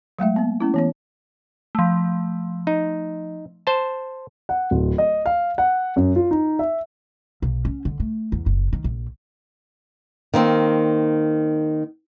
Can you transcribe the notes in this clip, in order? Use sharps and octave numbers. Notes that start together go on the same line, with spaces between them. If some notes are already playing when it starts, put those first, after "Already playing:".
F#3 G#3 A3 E5
A#3 B3
A3 C#4 E4
E3 B3 C#5
F3 A3
D#4
C5 A5
F#5
D1
D#5
F5
F#5
F#2
F4
D#4
E5
B1
C#4
D3
A3
E2
F#1
D#3
A#1
D#3 A#3 C4